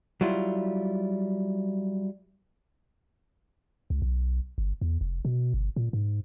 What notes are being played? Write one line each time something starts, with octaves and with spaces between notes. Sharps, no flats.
F#3 G3 E4 F4
C#2
B1
G1
E2
F1
B2
G1
A#2
G#2